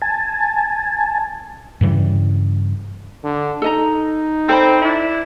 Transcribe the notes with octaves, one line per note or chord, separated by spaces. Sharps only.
G#5 A5
G2 C#3 E3 G3
D3
D#4 A4 D#5 A#5
C4 A4 D5 B5
D4 E4